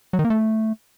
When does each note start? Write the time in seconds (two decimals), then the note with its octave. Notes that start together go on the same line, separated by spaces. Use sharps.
0.13 F#3
0.19 D#3
0.25 A#3
0.30 A3